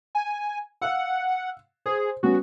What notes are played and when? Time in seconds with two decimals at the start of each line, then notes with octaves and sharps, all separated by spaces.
0.15 G#5
0.82 F5 F#5 E6
1.86 G#4 C5
2.23 G3 B3 C#4 F#4